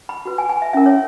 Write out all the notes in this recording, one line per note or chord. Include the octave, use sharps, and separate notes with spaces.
B5
F#4 B4
G#5
G#5
E5
C#4 E4 A#4 E5
C#5